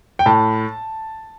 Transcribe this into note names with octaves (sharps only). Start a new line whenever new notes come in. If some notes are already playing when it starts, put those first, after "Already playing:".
G5
A2 A5